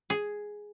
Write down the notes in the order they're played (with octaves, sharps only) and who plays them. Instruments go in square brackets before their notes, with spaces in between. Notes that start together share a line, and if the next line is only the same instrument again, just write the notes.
[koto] G#4